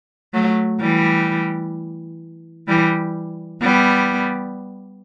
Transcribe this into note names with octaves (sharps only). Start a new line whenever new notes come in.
F#3 A3
E3 G3
E3 G3
G3 B3